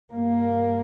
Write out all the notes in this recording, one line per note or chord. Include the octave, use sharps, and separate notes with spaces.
G2 A#3